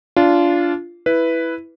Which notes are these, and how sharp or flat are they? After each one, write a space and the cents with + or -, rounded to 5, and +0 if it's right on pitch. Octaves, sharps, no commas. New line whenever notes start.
D4 -20 F4 -15
E4 +0 B4 +0